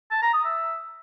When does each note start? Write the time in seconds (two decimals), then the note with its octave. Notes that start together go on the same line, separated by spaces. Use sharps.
0.11 A5
0.22 A#5
0.33 D#6
0.45 E5